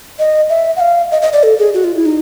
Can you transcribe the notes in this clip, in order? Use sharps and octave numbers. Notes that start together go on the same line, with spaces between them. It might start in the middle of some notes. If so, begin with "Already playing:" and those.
D#5
E5
F#5
F5
D#5
D#5
D5
A4
G#4
F#4
F4
E4
D#4